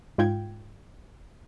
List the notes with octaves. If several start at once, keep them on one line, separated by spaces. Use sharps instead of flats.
G#2 F4 G5 G#6